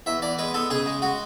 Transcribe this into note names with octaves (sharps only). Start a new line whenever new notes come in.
E2 E5
E2 D5
G#3 B4
B3 A4
C#3 G#4
G#3
G#3 F#4